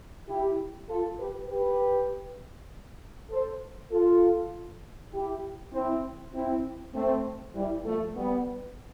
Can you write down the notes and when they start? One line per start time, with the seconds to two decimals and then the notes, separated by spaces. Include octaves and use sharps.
0.28 E4 G4
0.89 F4 A4
1.19 G4 B4
1.50 G4 B4
3.31 A4 C5
3.91 F4 A4
5.13 E4 G4
5.73 C4 E4
6.33 C4 E4
6.94 A3 C4
7.55 E3 G3
7.85 F3 A3
8.15 G3 B3